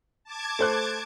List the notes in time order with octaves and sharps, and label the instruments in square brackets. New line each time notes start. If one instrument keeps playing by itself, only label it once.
[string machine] A5 D6 G#6
[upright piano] A3 C5 F#6